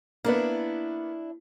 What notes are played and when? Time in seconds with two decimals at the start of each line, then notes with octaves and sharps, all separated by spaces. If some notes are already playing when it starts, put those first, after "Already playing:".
0.25 A#3 B3 D4 E4